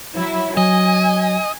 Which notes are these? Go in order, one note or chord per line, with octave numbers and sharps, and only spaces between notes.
F#3 E4
F#3 D#5 G#5